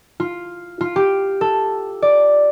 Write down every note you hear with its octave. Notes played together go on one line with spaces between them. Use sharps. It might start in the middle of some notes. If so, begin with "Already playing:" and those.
F4
F4
G4
A4
D5